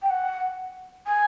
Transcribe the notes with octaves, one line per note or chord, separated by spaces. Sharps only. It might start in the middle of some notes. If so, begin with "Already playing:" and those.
G5
F#5
G#5